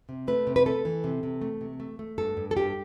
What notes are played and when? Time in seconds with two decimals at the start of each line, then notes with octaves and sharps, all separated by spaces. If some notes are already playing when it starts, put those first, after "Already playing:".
0.09 C3
0.28 A3 B4
0.47 C3
0.56 B4
0.66 A3 A4
0.85 E3
1.04 C3
1.23 C3
1.41 A3
1.61 C3
1.80 A3
1.99 A3
2.18 G2 A4
2.37 G2
2.51 A4
2.56 G2 G4